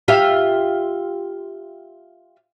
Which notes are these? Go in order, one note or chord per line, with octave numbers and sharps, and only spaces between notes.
F4 G4 E5